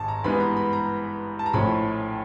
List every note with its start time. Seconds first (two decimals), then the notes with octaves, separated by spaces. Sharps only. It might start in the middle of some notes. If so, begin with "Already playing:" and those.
Already playing: G#1 G#2 A5
0.08 A#5
0.24 G2 E3 G#3 B3 B5
0.40 A#5
0.57 B5
0.73 A#5
1.39 A5
1.46 A#5
1.53 A#1 A2 F3 A3 C#4 B5